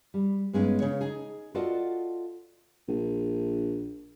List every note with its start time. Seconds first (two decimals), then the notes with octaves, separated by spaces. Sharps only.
0.14 G3
0.53 G2 G#3 B3 C#4 D#4
0.80 C#3 C#5
1.01 D#4 G#4
1.54 F4 F#4 A4 D5 D#5 F#5
2.88 A#1